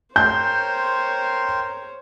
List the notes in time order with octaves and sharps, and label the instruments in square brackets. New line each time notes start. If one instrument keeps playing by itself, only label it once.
[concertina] A#4 G5 C6 [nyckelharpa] C5 C#5 [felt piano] G6